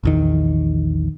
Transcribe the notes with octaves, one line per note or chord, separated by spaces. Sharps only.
A#1 E2 D#3